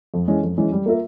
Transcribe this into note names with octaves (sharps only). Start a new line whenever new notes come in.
F2
E3 G#3 C#4
F2
E3 G#3 C#4
G3
A#3 F4 A#4 E5